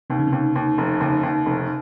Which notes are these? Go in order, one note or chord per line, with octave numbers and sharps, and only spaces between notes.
D#2 C3
C#3
C3
D#2
D#2
F1
D#2 C#3
D#2
F1